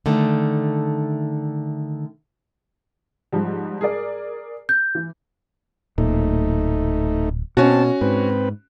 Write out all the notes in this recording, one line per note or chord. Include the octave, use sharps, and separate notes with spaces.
D3 D#3 A3
G#2 F3 G3
G#4 A#4 D5
G6
E3
D1 A#2 A3 D#4
B2 C4 C#4 F#4 A5
G#2 C4 B4